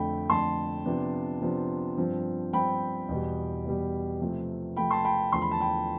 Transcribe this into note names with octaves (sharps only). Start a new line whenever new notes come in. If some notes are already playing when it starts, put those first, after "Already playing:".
Already playing: F2 D3 A3 G5 B5
F2 D3 A3 A5 C6
C3 F3 B3 D4
C3 F3 B3 D4
G2 F3 C4
G2 F3 C4 G5 B5
E2 B2 G3
E2 B2 G3
C3 F3 A3 C4
C3 F3 A3 C4 G5 B5
A5 C6
G5 B5
E2 D3 F3 A3 C6
B5
A5
G5 B5